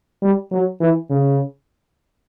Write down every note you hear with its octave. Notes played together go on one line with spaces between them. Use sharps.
G3
F#3
E3
C#3